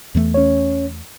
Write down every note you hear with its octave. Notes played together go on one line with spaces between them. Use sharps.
E2 E3 A3
C#4 C#5